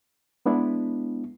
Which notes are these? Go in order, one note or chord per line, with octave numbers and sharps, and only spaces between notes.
G#3 B3 D4 E4